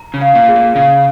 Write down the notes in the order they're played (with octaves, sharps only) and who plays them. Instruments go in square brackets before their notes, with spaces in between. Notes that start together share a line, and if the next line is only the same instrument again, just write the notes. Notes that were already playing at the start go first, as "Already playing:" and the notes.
Already playing: [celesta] A#5
[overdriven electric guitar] C#3
[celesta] F5
[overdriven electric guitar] A#2
[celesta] G#4
[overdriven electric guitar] A#2
[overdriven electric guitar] C#3 [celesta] F5